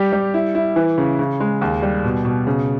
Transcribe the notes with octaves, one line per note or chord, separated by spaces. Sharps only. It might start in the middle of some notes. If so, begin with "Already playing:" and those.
Already playing: G3 G4
G3
E4
E4
E3
C#3
C#3
G#3
D#2
G3
B2
B2
C#3